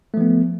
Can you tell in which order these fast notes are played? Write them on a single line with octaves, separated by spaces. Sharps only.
A3 F3 B3